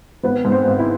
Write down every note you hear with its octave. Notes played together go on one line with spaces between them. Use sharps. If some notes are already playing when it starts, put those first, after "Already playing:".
G#1 B3 B4
G#2
C4 C5
G#1
E4 E5